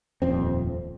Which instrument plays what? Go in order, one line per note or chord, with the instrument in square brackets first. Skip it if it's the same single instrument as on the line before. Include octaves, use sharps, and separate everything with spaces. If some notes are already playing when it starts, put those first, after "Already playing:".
[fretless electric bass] D#1 F2 C4